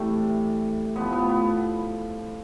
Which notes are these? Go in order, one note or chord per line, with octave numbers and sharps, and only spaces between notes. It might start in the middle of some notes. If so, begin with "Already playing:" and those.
Already playing: C3 E3 G3 A3
A2 F3 B3
B3
B3